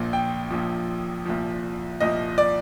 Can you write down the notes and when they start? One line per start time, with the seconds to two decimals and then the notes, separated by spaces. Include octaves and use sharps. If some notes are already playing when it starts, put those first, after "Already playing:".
Already playing: A#1 A#2 F3
0.13 G5
0.50 A#1 A#2 F3
1.25 C2 A#2 F3
2.00 C2 A#2 F3 D#5
2.38 D5